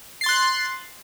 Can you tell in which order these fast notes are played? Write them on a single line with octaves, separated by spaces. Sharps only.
C7 A6 C6 F#6